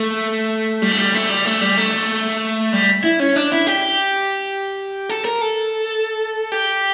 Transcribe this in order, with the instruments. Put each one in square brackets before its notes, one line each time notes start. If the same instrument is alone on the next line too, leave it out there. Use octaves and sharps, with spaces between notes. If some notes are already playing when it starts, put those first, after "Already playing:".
Already playing: [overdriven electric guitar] A3
G3
A3
G3
A3
G3
A3
G3
A3
G3
E4
C#4
D4
E4
G4
A4
A#4
A4
G4